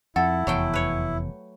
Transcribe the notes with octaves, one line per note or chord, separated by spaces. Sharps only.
F2 E4 A4 F#5
F1 E2 F#3 A3 G5
B4 C#5